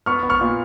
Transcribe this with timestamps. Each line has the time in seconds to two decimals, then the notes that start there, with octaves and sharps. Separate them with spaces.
0.06 B3 C#6 F6
0.23 B3
0.29 C#6 F6
0.41 A#2